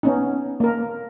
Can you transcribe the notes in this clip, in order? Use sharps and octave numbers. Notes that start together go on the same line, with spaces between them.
B3 C#4 D#4
A#3 A#4